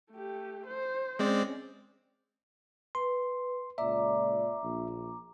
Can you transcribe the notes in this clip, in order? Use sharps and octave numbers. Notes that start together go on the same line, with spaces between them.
A3 G4
C5
G#3 C4 C#4 D5
B4 C6
C#2 A#2 D5 E5 A#5 D6
A#1